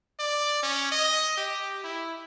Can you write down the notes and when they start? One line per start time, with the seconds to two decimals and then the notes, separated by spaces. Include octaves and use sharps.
0.19 D5
0.63 C#4
0.92 D#5
1.37 G4
1.84 E4